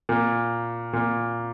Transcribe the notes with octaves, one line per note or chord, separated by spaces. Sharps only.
A#2
A#2